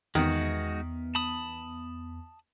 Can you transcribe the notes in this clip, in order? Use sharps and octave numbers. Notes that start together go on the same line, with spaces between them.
E2 D#3 G#3 B3 D#4 F#4
A5 B5 D#6